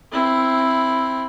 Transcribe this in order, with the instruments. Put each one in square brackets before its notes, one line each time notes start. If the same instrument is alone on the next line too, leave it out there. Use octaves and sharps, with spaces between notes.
[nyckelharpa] C4 E4